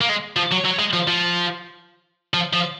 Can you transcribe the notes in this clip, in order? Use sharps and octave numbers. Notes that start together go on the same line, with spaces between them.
A#3
G#3
F3
F#3
F#3
G#3
F3
F3
F3
F3